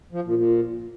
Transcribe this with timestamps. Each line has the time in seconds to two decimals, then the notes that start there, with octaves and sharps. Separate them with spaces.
0.12 F3
0.24 A#2
0.36 A#2